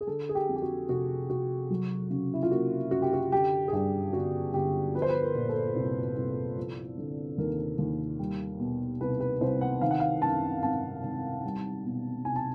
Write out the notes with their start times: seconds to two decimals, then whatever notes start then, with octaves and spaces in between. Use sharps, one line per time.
0.01 G#4
0.07 D3 A4
0.29 G#4
0.35 G4
0.49 F2
0.56 G4
0.62 F#4
0.89 F1 F#4
1.29 F1 F#4
1.70 F#3
2.10 C#3
2.34 E4
2.43 F4
2.51 A#3 F#4
2.91 F#2 F#4
3.02 G4
3.13 F#4
3.32 D3 G4
3.68 G#4
3.73 G2 G4
4.13 G1 F#4
4.54 G1 G4
4.94 F3 B4
5.02 C5
5.09 B4
5.22 A#4
5.35 A#2
5.49 A4
5.75 C2
6.17 C2
6.57 F3
6.98 D3
7.38 D#2 A#4
7.78 D#2
8.19 G3
8.60 B2
9.00 C2 B4
9.20 B4
9.41 C2 C5
9.61 F#5
9.81 D#3 F5
9.91 F#5
10.00 F5
10.22 F#2 A5
10.63 G#1 A5
11.03 G#1
11.44 G3
11.85 B2
12.25 C2 G#5
12.36 A5